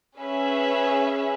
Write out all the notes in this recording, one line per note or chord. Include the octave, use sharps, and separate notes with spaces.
C#4 G#4 B4 E5